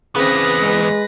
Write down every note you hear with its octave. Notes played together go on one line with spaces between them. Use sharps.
E2 C#3 B3 C4 B4 A#6
G#3